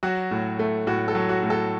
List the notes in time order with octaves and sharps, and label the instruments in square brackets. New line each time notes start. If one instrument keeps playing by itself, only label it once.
[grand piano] F#3 F#4
A2
A3
A2 F#4
A4
F#3
F#4
A2
A4